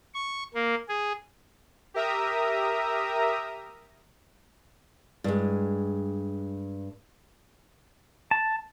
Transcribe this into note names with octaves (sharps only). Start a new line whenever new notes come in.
C#6
A#3
G#4
G4 A#4 E5 A#5 D#6
G2 G#3
A5